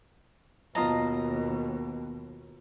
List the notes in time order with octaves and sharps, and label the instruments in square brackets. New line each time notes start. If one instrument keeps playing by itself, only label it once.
[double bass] D#2 B2 [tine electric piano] F#3 B3 [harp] F4 D#5 A5 [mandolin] A#5